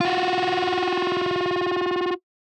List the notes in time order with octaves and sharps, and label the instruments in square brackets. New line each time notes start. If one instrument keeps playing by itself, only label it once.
[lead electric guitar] F4 F#4